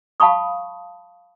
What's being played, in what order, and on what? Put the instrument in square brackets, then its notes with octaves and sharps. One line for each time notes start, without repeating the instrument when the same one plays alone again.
[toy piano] F5 A5 B5 C#6 D#6